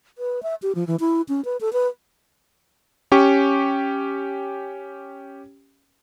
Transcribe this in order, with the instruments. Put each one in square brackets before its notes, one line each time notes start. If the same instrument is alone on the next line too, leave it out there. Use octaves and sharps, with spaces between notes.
[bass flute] B4
E5
G4
F3
E3
E4
C#4
B4
A4
B4
[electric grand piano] C#4 G4 C#6